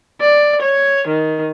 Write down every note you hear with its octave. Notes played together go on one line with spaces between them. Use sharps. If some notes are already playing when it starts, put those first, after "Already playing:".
D5
C#5
D#3